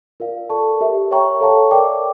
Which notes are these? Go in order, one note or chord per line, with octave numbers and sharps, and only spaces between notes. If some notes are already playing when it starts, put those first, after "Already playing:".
F4 A#4 D5 F5
A4 D5 A5 C#6
G4 A#4 E5
C#5 E5 G5 A#5 C#6
A4 C#5 F5 A5 C#6
A#4 D5 G5 D6